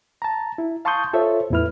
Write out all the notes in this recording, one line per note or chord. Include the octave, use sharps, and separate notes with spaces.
A5 A#5
E4
F5 A5 C6 C#6 D#6 G6
F4 A4 C5 C#5 E5
E2 A2 A3 E4 B4 F6